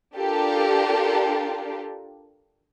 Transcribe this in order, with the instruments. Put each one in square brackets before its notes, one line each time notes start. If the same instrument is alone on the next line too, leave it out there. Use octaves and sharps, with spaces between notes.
[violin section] D4 F4 G4 A4 A#4